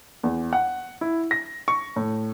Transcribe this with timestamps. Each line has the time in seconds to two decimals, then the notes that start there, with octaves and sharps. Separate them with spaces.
0.23 E2
0.53 F#5
1.01 E4
1.31 A#6
1.68 C#6
1.96 A2